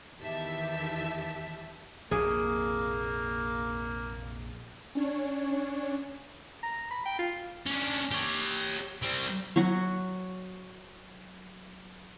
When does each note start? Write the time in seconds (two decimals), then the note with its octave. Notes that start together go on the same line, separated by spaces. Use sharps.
0.19 E2 D#3 E3 G4 E5 A5
2.11 A#1 F2 C3 A#3 G#4
4.95 C#4 D4 C#5
6.63 A#5
6.91 B5
7.05 G5
7.19 F4
7.66 C#4 D4
8.11 G4 C#5
9.02 G3 C4
9.56 F#3 F#4